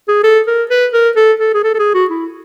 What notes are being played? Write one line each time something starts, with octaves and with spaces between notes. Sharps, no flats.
G#4
A4
A#4
B4
A#4
A4
A4
G#4
A4
A4
G#4
F#4
E4